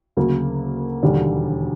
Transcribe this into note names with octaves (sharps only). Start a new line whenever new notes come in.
D2 C#3 F#3 A#3
E1 D#2 D3 G3